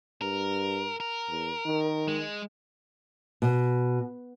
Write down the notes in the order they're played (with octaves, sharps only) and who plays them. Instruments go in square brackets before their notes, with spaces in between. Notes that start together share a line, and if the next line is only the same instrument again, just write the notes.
[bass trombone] G2 [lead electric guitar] A#4
[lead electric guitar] A#4
[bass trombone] E2
D#3
[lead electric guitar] G#3
[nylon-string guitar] B2